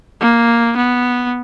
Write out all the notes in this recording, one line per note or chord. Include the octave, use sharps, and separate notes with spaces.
A#3
B3